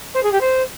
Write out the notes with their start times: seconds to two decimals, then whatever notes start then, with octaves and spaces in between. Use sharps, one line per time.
0.14 C5
0.23 G#4
0.32 G4
0.41 C5